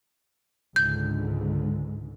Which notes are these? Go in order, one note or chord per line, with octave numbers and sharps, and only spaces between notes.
C#2 G#2 D3 G6